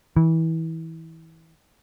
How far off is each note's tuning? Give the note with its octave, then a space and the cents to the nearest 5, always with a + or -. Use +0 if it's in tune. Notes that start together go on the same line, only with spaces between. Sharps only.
E3 -25